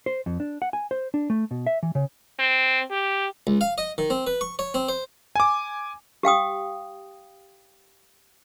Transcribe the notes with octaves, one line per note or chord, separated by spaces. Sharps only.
C5
F2
D4
F#5
G#5
C5
D4
A3
B2
E5
E3
C#3
C4
G4
C#2
F5
D#5
D#3
C4
B4
C#6
C#5
C4
C5
G#5 D6
G4 F5 G5 D#6